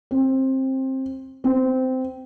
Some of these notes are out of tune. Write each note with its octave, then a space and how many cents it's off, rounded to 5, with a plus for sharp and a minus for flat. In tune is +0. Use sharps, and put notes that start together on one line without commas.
C4 +20
C4 -15